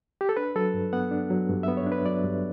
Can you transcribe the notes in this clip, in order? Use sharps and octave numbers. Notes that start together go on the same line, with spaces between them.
G4
A4
D4 B4
F#3 A4
G2
B3 F#5
D4
F#3
G2
B3 E5
C#5
D4
B4
F#3 D5
G2